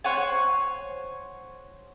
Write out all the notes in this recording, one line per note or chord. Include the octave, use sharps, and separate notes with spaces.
C5 C#5 F#5 G#5